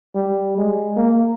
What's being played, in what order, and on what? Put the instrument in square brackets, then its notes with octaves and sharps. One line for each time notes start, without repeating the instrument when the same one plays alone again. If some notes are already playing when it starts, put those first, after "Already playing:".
[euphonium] G3
G#3
A#3